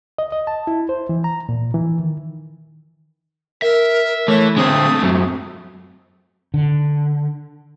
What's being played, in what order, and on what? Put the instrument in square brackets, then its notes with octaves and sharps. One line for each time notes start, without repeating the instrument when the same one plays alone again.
[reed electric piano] D#5
D#5
A5
E4
C5
E3
A#5
A#2
E3
D#3
[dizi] A#4 [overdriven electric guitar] E5
[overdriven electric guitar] E3 [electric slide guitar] A3 [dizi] C#5
[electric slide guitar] D3 C4 C5 [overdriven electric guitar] G#3 A3 [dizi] D#6
[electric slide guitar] F#2 F#3 C4
[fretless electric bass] D3